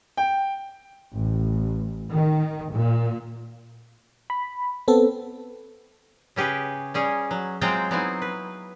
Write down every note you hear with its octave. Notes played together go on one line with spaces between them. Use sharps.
G5
A1
D#3
A#2
B5
B3 C4 A4
C#3 C#4 G4 G#4 B4
G3 C#4 G#4
F#3
F#3 G#3 C4 F4 G5 A#5
F#3 B3 C4 D#4 E4 G#5
B4